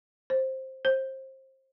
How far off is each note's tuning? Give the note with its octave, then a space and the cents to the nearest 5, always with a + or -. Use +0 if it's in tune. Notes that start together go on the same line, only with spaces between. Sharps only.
C5 +10
C5 +25